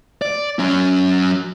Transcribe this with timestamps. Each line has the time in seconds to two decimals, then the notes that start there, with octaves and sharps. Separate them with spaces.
0.22 D5
0.59 F#3 C#4